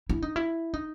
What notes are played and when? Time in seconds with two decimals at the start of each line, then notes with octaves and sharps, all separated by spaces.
0.09 E4
0.22 D#4
0.36 E4
0.74 D#4